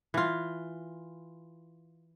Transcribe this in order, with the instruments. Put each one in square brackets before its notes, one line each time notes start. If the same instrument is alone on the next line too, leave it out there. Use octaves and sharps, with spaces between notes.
[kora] E3 F4